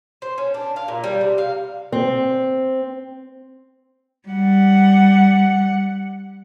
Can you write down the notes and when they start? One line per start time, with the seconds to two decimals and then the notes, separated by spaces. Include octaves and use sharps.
0.22 C5
0.38 C#4
0.54 D4
0.76 F5
0.88 A#2
1.04 G3
1.21 C3
1.38 F5
1.92 C4
4.28 G3 F#5